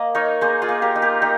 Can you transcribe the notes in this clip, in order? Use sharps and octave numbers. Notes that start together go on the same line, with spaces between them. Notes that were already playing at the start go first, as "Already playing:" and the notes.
Already playing: A#3 D#5
D#4 A#4 C#5
A#3 G#4 C5
F4 G#4
A#3
G4 A#4
D#4
G4 A#4
D#4 G4